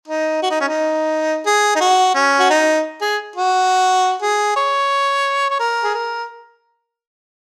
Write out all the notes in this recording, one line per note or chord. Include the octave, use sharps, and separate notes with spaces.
D#4
F#4
D#4
C#4
D#4
G#4
D#4
F#4
C#4
F#4
D#4
G#4
F#4
G#4
C#5
C#5
A#4
G#4
A#4